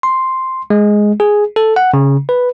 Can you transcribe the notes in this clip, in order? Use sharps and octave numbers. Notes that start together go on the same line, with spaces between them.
C6
G#3
G#4
A4
F#5
C#3
B4